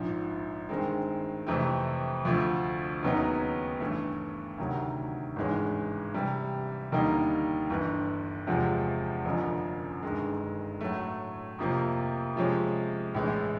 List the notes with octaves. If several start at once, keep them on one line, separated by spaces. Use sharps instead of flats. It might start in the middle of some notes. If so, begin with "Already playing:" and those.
Already playing: A#1 G#2 F3
G2 D#3 G#3 C4
F2 C3 E3 A3 C4
D2 D3 F3 A3
D#2 C#3 F#3 B3 D#4
G2 E3 A3
D2 C3 D#3 F#3
G#1 G2 E3 G#3 C#4
C3 E3 G3
D#2 D3 G3 A#3 D#4
G1 G2 E3
E2 C3 F3 G#3
F#1 F#2 D3 F3
G1 G2 D#3 G#3
A2 F#3 A3
F2 C3 F3 A#3
C3 F3 G#3 C#4
A#1 A2 E3 G#3